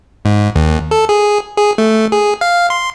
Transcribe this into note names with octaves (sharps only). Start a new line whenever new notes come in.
G#2
D#2
A4
G#4
G#4
A3
G#4
F5
C6